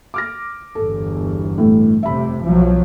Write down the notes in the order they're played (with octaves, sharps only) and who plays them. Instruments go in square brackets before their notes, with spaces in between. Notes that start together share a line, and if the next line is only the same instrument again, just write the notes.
[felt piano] D6 F6 A#6
[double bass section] G1 E2 [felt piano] A4
[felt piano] A2
[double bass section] F1 C3 [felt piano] E5 B5
[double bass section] B1 F3 F#3